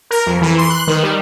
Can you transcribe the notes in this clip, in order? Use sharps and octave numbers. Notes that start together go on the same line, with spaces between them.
A#4
F2
E3
C6
F#6
D#3
G3